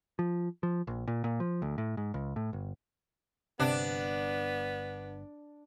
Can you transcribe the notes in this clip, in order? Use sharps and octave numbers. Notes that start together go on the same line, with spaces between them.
F3
F3
A#1
A#2
A#2
F3
D2
A2
G#2
C#2
A2
G1
G1 C3 B3 D4